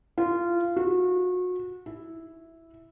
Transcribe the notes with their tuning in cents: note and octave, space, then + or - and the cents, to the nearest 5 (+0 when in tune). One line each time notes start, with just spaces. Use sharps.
F4 -20
F#4 -30
E4 -5